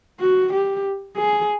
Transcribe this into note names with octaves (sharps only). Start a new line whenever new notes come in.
F#4
G4
G#4